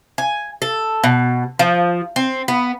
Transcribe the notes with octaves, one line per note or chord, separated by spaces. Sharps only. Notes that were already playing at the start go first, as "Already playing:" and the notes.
G#5
A4
B2
F3
C4
B3